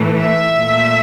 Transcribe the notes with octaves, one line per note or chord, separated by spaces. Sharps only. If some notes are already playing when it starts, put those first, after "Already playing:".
Already playing: A2 E3 A3
E5
A#2 A3